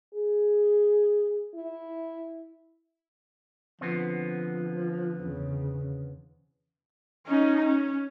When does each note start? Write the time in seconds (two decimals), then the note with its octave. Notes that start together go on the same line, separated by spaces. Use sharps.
0.14 G#4
1.54 E4
3.81 D3 F3 B3 C4
5.17 E2 C#3
7.27 C#4 D#4
7.65 C#4